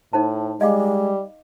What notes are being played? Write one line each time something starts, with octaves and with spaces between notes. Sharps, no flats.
A2 D#4 C5 A5
G3 G#3 D#5 F5 D6